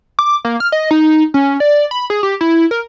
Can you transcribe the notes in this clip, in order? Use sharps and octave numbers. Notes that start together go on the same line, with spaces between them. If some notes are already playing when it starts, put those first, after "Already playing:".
D6
A#3
F6
D#5
D#4
C#4
D5
B5
G#4
G4
E4
A#4